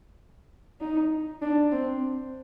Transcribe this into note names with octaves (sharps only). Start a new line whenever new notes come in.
D#4
D4
C4